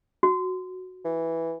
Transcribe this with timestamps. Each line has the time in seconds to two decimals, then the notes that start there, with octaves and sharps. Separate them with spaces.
0.23 F#4
1.05 E3